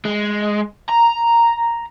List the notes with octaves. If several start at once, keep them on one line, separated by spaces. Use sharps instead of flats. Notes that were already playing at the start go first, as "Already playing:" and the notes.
G#3
A#5